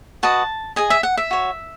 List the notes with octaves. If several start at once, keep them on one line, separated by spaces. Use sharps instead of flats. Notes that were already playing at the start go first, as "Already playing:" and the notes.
F#4 B4 D#5 A5
G#4 D#5 G#5
E5
F#5
E5
F#4 C#5